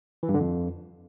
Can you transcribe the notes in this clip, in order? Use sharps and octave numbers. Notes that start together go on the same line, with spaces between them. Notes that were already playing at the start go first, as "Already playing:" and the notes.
E3
G2
D3
F2